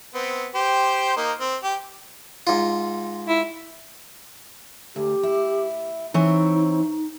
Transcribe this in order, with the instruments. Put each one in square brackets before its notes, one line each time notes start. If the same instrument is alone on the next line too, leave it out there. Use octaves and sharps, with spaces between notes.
[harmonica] B3 C4
G4 C5
A#3 D#4
C4
G4
[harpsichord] G#2 F4
[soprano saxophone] E4
[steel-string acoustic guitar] D2 [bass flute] G4
[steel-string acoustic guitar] E4
[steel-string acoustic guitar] E3 C4 C#5 [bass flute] D#4